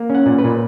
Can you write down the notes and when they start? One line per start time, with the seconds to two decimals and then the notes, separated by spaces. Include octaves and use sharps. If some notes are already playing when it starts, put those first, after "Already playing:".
Already playing: A#3
0.10 C#4 F#5
0.26 A#2
0.39 B4
0.44 A#2